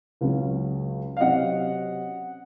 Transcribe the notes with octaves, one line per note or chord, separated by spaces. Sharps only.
C#2 C#3 F#3 C#4
F5
C3 F#3 C#4 D#5 F#5